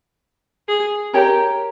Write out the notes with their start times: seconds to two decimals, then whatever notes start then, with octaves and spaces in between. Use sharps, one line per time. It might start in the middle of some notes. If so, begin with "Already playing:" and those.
0.68 G#4
1.13 G4 A#4 C#5 G5 A#5